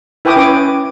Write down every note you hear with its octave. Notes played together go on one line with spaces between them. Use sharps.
E4 B4 G5 G#5 D6 D#6
C#4 B4 D6